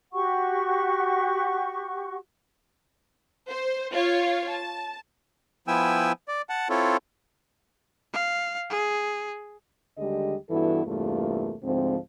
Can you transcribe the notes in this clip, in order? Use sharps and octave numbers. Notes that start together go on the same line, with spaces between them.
F#4 G4 F#5 C#6
C5
F4 C#5 F5
A5
F3 B3 E4 G5 G#5 E6
D5
F#5 A5
C4 E4 F4 A4 C#5
F5
G#4
D#2 D3 G3 G#3 G4 D#5
G2 E3 B3 E4 F#4 A4
E2 G2 C3 A3 A#3 F4
D2 G#2 F3 C4